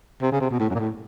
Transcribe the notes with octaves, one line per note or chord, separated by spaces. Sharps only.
C3
C#3
C3
B2
A2
F#2
A#2
A2